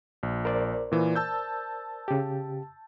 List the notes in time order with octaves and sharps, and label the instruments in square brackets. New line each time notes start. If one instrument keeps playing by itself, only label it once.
[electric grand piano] A#1
[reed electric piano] A#4 C5 D5
[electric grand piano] A#2 E3
A5 E6 G6
[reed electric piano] C#3 G4